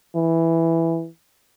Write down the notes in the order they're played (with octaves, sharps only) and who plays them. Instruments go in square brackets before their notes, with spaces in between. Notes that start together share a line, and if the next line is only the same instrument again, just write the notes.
[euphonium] E3